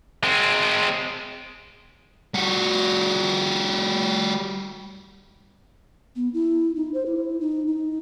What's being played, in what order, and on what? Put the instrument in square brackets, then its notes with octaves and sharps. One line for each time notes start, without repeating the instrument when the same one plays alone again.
[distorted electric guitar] G#3 C4
G3 F#4
[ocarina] B3
E4
D#4
C5
E4
D#4
D#4